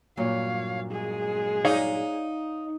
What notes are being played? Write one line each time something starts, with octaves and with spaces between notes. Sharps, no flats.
G2 A#2 F#3 C#5 F5
G#3 G#4
D#4 C#5 D5 F5